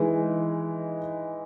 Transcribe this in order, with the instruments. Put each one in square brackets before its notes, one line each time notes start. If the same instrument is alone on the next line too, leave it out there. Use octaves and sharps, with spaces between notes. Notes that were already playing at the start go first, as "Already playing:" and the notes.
Already playing: [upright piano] E3 G#3 D#4